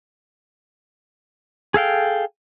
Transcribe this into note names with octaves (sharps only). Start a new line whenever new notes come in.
G#4 A4 F5 G5